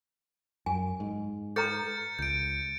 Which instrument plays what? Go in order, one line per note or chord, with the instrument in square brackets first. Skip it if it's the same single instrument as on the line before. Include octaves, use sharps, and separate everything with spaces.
[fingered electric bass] F#2 [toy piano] G#5
[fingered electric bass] G#2
[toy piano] A4 B4 A#5 [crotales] G6 A6 C#7
[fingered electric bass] C#2 [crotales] G6 D7